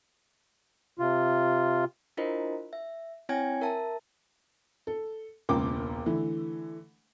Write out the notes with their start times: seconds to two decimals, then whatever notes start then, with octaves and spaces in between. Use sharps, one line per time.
0.99 C3 F4
2.17 D4 E4 F4 A#4 C5 D#5
2.73 E5
3.29 C4 E4 C#5 G5 G#5 G#6
3.61 A#4 E5 A5
4.87 A4
5.49 E1 C#2 A#3 A#4 G5 D6
6.06 D3 E3 A3